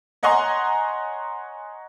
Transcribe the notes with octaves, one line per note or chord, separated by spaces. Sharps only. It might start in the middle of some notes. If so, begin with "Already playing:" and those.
C#5 D#5 F#5 G#5 A#5 C6